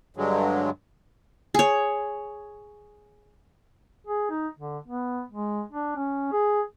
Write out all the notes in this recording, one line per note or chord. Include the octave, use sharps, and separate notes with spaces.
G2 D3 F#3 G#3
G#4 C#5
G#4
D#4
D3
B3
G#3
D4
C#4
G#4